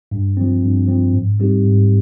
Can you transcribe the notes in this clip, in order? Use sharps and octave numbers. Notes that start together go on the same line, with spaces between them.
G2
F3 C4
G2
F3 C4
G#2
G3 C4 D#4 G4
G#2